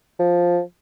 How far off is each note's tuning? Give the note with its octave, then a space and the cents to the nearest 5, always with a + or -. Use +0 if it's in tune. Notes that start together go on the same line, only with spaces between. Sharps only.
F3 +5